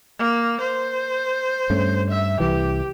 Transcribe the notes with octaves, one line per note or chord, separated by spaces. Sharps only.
A#3
C5
G2 A3 C#4
E5
C2 E3 G4